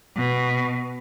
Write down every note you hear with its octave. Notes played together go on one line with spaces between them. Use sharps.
B2